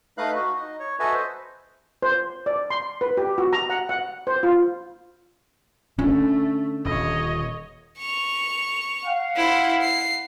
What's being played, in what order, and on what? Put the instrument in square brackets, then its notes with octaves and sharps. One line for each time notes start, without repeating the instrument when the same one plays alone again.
[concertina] A3 D#4 B4 F5 F#6
F#4
D#4
C#5
F#4 A4 B4 D#5 E5 G#5
C5
[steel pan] C5
D5
C6
B4
G4
F#4
A#5
F#5
F#5
C5
F4
[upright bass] D3 [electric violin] A3 [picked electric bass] C#4
[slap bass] D#1 [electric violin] C#5 D#5
[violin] C#6 F7
[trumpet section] F5 F#5
[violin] E4 C5
C7